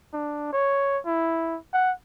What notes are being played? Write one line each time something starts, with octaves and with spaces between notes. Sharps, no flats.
D4
C#5
E4
F#5